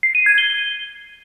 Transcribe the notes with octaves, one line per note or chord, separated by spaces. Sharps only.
C7
D#7
G#6
G7